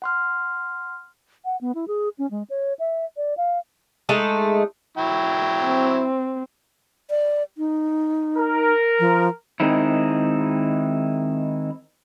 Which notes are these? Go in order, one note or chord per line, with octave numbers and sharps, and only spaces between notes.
F#5 C6 F6
F#5
B3
E4
G#4
C#4
G#3
C#5
E5
D5
F5
G#3 A3 D#4 A5
F#3 E4 G5
C4
D5
D#4
A#4
F3
D#3 G#3 C4 D#4 E4